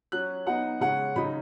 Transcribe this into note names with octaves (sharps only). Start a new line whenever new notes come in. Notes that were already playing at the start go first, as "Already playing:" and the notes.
F#3 C#4 F#6
F#3 B3 D#4 F#5
C#3 G#3 C#4 F#5
C#3 F#3 D#4 B5